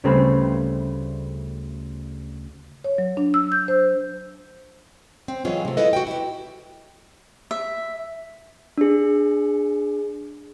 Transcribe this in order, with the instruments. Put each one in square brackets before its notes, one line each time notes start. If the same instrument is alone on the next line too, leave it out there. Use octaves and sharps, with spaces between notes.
[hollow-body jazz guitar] D2 C#3 G3 A3 C4 B4
[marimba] C#5
F#3
D4
E6
G6
C5
[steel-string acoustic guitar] C4
E3 F#3 G#3 B3 C#4 F4
C3 A3
G#3 E4 F4 A4 B4 D#5
F#4 G5
E4 G4
[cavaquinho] E5
[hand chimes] D4 G#4